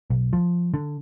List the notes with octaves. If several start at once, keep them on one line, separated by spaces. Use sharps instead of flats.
B1
F3
D3